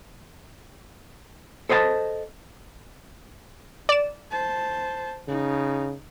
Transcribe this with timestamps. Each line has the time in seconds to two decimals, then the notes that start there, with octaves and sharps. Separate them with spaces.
1.69 A4 C5 D#5 F#5 A5
3.89 D5 E7
4.31 C5 A5
5.28 C#3 D#4